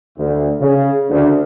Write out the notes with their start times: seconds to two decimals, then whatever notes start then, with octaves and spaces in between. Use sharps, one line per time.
0.18 D2
0.61 C#3
1.10 D2